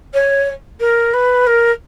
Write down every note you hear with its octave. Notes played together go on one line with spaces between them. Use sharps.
C#5
A#4
B4
A#4